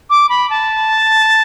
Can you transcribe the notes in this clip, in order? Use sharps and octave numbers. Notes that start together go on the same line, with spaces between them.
D6
B5
A5